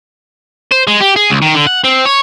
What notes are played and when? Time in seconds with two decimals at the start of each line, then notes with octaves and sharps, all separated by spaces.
0.72 C5
0.88 G#3
1.01 G4
1.16 G#4
1.30 C#2
1.42 D#3
1.54 D3
1.67 F#5
1.84 C4
2.06 C#5